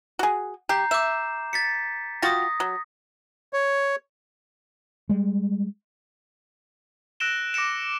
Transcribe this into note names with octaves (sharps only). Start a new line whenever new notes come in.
F#4 G#4
G4 A#5 G6 C7
E5 D6 G6 E7
A6 B6 C#7
F4 F#4 G5 D#6 A#6
F#3
C#5
G3 G#3
E6 F#6 A#6 D7 E7 G7
D6 A#6 C#7 D7 E7